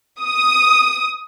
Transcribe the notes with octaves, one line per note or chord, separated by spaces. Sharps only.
D#6